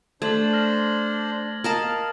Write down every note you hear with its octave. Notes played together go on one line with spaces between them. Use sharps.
A3 D4 C5 G#6 A6 F#7
F6 A#6
A#4 D#5 F5 A5